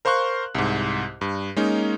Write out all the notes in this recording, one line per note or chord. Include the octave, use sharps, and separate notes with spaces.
A#4 C5 F5 C6 C#6 F#6
C2 G#2
G2
G#3 A#3 C#4 D#4